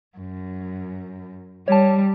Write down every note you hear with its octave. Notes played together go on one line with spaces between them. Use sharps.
F#2
G3 C#5 A5